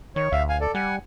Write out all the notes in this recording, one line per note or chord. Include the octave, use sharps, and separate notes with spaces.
D#3 C#5
D2 E5 F5
F5 G#5
A4 D5
G3 F#5 G#5